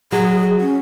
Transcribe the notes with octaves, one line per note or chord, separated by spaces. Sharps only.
F#3 G#4
C#4